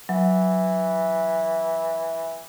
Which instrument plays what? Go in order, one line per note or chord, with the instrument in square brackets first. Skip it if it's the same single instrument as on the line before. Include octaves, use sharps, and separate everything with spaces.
[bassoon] E3 [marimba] F#3